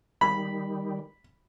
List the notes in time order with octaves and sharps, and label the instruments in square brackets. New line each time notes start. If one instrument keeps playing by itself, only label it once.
[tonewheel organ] D#3 G3 [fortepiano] B5